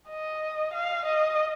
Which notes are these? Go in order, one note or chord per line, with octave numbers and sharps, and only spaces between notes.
D#5
F5
D#5